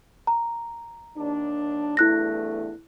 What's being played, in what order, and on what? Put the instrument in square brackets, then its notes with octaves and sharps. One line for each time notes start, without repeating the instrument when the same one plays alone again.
[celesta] A#5
[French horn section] D#2 D4
[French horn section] E2 G2 A3 [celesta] E4 F#6 A#6